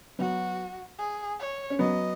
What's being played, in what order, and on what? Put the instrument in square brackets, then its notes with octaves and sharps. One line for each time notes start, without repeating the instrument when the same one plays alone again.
[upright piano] F#3 B3 [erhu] F#4
[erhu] G#4
C#5
[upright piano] C#4
[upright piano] F#3 B3 [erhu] D#5